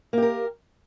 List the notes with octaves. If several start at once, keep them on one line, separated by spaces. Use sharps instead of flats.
A#3 G4 A#4